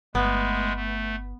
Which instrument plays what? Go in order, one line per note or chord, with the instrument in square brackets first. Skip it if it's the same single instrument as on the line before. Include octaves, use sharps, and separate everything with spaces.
[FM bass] G1 [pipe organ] G#3 A3 [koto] B3
[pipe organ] A3